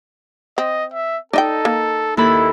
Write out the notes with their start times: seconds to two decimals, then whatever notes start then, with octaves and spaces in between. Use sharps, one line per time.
0.58 C4 D#5
0.93 E5
1.33 D#4 A4 D5 E5 G5
1.65 A#3
2.17 D#2 E4 A4 B5